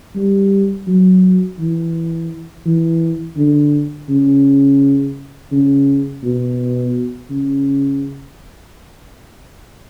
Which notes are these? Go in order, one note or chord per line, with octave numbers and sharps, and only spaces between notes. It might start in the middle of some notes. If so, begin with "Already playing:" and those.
G3
F#3
E3
E3
D3
C#3
C#3
B2
C#3